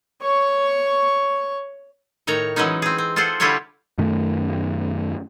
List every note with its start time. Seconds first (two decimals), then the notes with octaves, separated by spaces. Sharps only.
0.22 C#5 C#6
2.27 A2 D#3 C#5 A#5
2.56 E3 F#3 G#3 C#4 D#4
2.82 C4 G#4
2.98 C4
3.16 F4 G#4 A4 C5 F#5
3.40 D3 G3 E4 F4 G4 C#5
3.98 F#2 D#3 A3